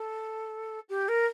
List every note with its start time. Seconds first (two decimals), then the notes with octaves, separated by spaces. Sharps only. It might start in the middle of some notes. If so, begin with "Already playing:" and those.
Already playing: A4
0.89 G4
1.08 A#4